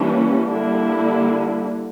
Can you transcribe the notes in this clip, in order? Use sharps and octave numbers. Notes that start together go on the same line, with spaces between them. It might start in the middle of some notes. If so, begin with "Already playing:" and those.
Already playing: E3 G3 A#3 C#4 D4
D3 G3 A#3 D4 E4